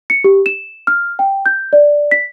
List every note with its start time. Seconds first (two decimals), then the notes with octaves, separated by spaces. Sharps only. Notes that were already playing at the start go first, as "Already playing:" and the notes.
0.10 C#7
0.24 G4
0.46 E7
0.87 F6
1.19 G5
1.46 G6
1.73 D5
2.11 B6